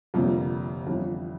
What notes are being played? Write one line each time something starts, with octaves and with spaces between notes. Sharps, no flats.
G1 F2 C3 G3 A#3
G1 F2 E3 G3